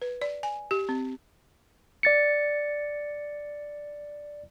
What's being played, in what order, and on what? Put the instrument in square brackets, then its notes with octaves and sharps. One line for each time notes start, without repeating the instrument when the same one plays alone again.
[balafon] B4
D5
G#5
G4
C4
[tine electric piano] D5 A6 C#7